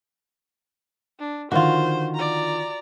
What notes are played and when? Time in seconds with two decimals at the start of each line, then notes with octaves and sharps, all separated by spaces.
1.20 D4
1.52 D3 D#3 F3 F4 F#4 C5
2.15 D5 A#5